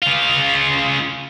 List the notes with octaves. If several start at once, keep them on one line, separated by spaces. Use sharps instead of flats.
C#3 F4